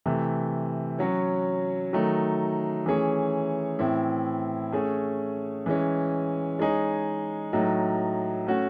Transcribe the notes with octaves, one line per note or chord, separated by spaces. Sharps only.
C3 E3 A3
F#3 C#4 F#4 C#5
D#3 F#3 A3 D#4
E3 A3 C#4 G#4 C#5
A2 E3 C4 E4
A3 C#4 G#4
E3 G#3 C#4
G#3 D#4 G#4 C#5
A2 F#3 A3 D#4
A3 C#4 F#4